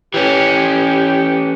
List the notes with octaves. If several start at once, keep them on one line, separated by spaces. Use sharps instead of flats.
E3 C#4 G4